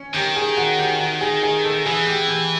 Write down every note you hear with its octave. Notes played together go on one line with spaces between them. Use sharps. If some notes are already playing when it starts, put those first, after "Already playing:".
Already playing: C#4
D#3 G4
G#4
F#4
G4
F#4
G#4
G#4
A4
E3 G#4
G4
G4